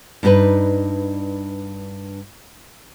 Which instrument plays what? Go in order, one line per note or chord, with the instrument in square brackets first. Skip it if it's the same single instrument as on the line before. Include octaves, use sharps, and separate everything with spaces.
[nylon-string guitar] G2 D4 D#4 G4 B4